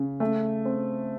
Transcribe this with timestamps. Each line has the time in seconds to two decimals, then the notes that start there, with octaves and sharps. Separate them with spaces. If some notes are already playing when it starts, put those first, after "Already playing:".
Already playing: C#3
0.20 A3
0.65 C4